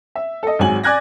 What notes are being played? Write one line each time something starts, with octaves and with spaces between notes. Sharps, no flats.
E5
A4 D#5
G#1 G#2 F#3 G#5 F#7
D5 G#5 F#6 G#6 A#6